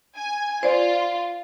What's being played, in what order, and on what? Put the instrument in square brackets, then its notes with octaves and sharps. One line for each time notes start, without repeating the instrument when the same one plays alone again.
[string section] G#5
[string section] F4 [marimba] C5 D5